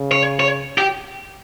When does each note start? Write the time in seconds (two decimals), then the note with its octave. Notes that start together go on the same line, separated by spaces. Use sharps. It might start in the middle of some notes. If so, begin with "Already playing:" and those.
Already playing: C#3
0.12 C#5
0.40 C#5
0.78 G4